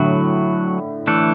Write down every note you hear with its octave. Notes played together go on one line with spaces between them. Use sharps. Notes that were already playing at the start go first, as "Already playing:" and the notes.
Already playing: A2 D3 F#3 A3 F#4
E3 A3 D4 A4